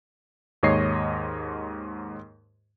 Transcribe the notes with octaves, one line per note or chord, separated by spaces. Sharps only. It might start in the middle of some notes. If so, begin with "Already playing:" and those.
D#2 G#2 C#5 D#5 C7